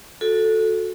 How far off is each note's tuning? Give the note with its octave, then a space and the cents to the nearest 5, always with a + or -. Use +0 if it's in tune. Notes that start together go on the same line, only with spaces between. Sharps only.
F#4 -20 A4 +0